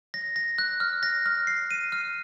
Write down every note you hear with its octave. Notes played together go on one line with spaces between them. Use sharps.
A#6
A#6
F#6
F6
A#6
F6
C7
D#7
F6